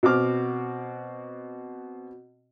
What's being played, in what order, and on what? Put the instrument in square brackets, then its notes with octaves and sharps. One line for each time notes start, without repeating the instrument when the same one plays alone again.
[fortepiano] B2 C4 F#4 D6 F6